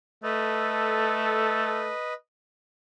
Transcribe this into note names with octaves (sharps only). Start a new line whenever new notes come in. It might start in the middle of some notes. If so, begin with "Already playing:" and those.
A3 A4 B4 D#5